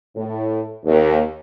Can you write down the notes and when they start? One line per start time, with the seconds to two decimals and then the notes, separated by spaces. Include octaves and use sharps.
0.15 A2
0.85 D#2